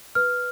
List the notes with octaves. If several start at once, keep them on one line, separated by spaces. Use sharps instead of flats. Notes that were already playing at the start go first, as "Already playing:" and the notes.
B4 F6